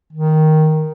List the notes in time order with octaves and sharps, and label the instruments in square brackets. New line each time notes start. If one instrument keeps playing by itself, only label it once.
[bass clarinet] D#3